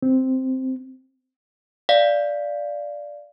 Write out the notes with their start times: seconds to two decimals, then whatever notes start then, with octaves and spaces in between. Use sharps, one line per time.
0.02 C4
1.89 D5 F5 B6